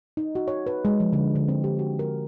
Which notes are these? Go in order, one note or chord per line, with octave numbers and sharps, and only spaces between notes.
D#4
F#4
C#5
B4
G#3
F3
D3
D3
C4
G4
F#4
A#4